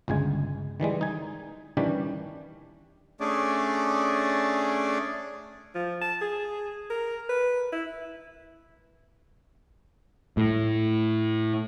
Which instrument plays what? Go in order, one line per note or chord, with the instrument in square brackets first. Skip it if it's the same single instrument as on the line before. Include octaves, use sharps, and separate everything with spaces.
[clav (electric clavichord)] G1 C#2 G#3 G#5
D#3 E3 G3 G#3
D#4 G#5
D#3 E3 G3 C#4 D4 G4
[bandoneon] A3 C#4 D4 G#4 D5
[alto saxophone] F3
A5
G#4
A#4
B4
E4
[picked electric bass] A2